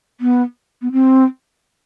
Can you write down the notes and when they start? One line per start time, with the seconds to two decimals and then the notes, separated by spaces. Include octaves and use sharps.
0.21 B3
0.82 B3
0.92 C4